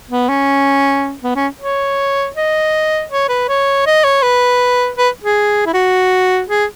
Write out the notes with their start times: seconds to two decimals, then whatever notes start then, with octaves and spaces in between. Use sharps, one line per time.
0.11 B3
0.29 C#4
1.23 B3
1.36 C#4
1.61 C#5
2.36 D#5
3.11 C#5
3.29 B4
3.49 C#5
3.86 D#5
4.04 C#5
4.23 B4
4.98 B4
5.24 G#4
5.66 E4
5.74 F#4
6.48 G#4